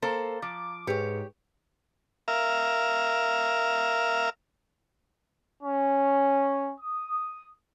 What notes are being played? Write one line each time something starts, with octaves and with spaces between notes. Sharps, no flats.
A#3 A4 C5 F5 A#5
F3 D6
G#2 G4 G#4 B4 C#5 C#7
A#4 E5 F5
C#4
D#6